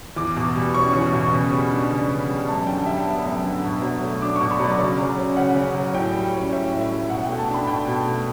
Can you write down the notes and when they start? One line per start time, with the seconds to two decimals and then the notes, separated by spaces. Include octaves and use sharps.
0.16 E2 D6
0.36 B2
0.55 G3
0.74 C#4 C#6
0.93 E2
1.13 B2
1.33 C#3
1.51 G3
1.71 D4
1.90 C#3
2.09 C#3
2.29 G3
2.47 F#2 A5
2.67 D3 G5
2.86 G3 E5
3.06 B3
3.25 F#2
3.44 D3
3.64 B2
3.82 F#3
4.01 A3
4.22 D4 D6
4.36 B2 C#6
4.51 B5
4.59 F#3 D5
4.79 C#3 D5
4.98 F#3
5.18 C#4
5.37 C#3 F#5
5.56 C#3
5.75 F#3
5.94 A2 G5
6.14 G3
6.33 C#4
6.53 A2 E5
6.72 A2
6.81 E5
6.91 G3
7.09 B2 F#5
7.25 A3 G5
7.38 A5
7.49 D4
7.54 B5
7.67 B2 G5
7.87 B2
8.06 A3